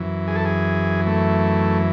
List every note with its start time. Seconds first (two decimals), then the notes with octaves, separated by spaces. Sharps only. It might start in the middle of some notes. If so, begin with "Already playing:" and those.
Already playing: F#2 E3
0.28 G#4
0.36 A4
0.45 G#4
1.07 A3